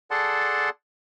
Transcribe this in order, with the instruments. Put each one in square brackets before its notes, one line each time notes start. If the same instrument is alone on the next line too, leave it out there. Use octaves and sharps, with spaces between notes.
[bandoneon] G#4 A4 D5 F#5 A5 C6